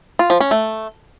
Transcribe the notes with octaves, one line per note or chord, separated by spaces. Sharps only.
F4
F3
C#4
A3